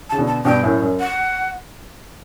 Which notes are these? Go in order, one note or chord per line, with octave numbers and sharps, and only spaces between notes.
A5
C#3
B2 D3
A5
G2 B2 G5
F#2 A2
F#2
F#5